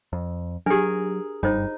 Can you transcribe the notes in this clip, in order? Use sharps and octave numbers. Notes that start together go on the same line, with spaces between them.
F2
F#3 D4 G4 G#4 A#4
F#1 G2 G3 D#4 F4 C5